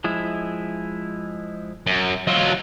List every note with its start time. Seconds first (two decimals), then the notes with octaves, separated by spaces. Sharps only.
0.04 F3 G#3 E4
1.87 F#2
2.27 F#3 F4 D#5 E6